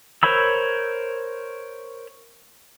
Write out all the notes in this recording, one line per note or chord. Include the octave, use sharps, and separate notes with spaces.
A#4 C5 C#5 B5 E6